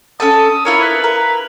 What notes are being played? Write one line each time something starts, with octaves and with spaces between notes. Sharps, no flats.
C#4 A4 A5 D#6
E4 F4 A#4 C#5
B4
A#4